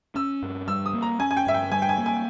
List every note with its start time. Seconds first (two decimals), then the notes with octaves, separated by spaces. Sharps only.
0.15 C#4 E6
0.42 G2
0.68 G3 E6
0.86 D#6
0.94 A#3
1.02 A#5
1.20 C#4 G#5
1.31 G#5
1.37 G5
1.46 G2 E5
1.54 G5
1.71 G3 G#5
1.82 G5
1.89 G#5
1.98 A#3
2.06 G#5